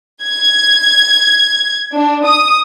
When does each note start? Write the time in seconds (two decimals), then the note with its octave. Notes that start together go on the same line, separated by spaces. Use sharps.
0.23 G#6
1.93 D4
2.25 D#6